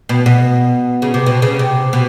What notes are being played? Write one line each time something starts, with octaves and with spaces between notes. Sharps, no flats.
B2
B2
C#3
C3
B2
C#3
C3
B2